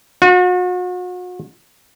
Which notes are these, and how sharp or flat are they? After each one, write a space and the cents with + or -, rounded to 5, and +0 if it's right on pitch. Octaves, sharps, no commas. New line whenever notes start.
F#4 -40